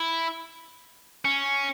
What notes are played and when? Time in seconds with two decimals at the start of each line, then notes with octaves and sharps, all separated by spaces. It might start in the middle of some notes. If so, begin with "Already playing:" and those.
Already playing: E4
1.25 C#4